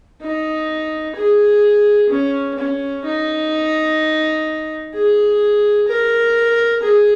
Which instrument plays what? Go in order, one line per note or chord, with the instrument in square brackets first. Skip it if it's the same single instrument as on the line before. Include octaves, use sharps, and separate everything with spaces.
[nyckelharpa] D#4
G#4
C#4
C#4
D#4
G#4
A#4
G#4